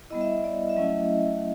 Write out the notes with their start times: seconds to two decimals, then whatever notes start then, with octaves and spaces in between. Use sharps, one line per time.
0.10 G3 B3 E4 D#5
0.21 E5
0.31 D#5
0.44 D5
0.69 E5
0.76 F#3 A3 C#4 E4 D#5